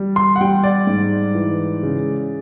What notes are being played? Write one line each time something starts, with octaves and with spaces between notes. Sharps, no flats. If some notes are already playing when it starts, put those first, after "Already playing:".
Already playing: G3
C6
F#5
G3 G5
D5
G#2
E3
C#3